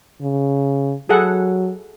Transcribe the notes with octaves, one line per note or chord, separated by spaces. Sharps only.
C#3
F#3 G#4 A4 F#5